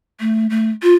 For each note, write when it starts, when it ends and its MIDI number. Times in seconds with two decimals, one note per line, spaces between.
0.20 0.47 57
0.50 0.70 57
0.83 0.95 65